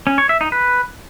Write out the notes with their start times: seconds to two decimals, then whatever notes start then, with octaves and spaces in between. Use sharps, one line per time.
0.07 C#4
0.18 C#5
0.29 E5
0.41 D#4
0.52 B4